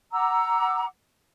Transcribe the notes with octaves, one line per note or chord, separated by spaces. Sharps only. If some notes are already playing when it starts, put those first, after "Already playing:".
F#5 A#5 D6 E6